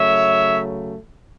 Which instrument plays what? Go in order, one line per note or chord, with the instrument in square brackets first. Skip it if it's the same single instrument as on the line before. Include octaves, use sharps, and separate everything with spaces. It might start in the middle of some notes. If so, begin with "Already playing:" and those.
Already playing: [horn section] C#3 F#3 A3 C#5 E5